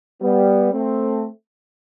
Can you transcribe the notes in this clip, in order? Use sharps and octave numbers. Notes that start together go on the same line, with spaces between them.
G3 B3
A3 C4